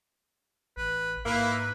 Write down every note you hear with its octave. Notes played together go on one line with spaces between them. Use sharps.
A1 B4
G#2 A#3 E4 B4